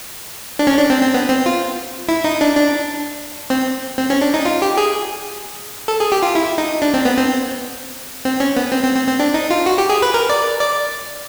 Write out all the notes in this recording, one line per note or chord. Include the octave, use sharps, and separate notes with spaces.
D4
C#4
D4
C4
C4
B3
C4
F4
E4
D#4
D4
D4
C4
C4
C#4
D4
D#4
F4
G4
G#4
A4
G#4
G4
F4
E4
D#4
D4
C4
B3
C4
C4
C#4
B3
C4
C4
C4
C4
D4
D#4
F4
F#4
G4
G#4
B4
A#4
D5
D5